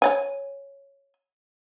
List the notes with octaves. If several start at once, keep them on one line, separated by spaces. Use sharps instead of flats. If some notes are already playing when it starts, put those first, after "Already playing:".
C#5 D5 G#5